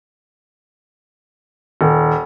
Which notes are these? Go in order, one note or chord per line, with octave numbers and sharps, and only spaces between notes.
D#1